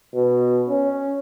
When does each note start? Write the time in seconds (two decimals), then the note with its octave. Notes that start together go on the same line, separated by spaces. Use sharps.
0.14 B2
0.69 C#4